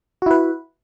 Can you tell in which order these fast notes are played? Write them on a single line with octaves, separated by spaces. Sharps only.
F#4 E4 B4